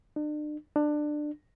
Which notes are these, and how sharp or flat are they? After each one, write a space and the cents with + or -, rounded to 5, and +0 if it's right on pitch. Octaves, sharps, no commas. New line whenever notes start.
D4 +40
D4 +20